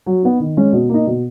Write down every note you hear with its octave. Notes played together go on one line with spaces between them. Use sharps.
F#3
B3 D#4
D#3
G#3 C#4
B2
A#3 D#4
B2